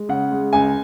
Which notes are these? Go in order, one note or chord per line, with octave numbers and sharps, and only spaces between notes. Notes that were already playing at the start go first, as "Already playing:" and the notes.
Already playing: G#3
C#3 F#5
G#3
C#2 G#5